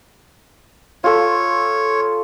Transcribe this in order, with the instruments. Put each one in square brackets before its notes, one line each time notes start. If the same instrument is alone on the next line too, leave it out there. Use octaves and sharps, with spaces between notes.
[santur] F4 A4 [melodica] C#5